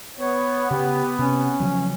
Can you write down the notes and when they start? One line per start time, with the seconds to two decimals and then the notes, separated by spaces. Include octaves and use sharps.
0.18 B3 C#5
0.71 C#3 G4
1.19 C3 C#4
1.60 C#3 F3 F#3